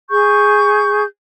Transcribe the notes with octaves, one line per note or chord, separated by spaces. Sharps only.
G#4 C#6 G6